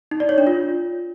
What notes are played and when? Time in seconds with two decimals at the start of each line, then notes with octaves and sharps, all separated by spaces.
0.11 D#4
0.20 D5
0.29 C#5
0.38 D4
0.47 F4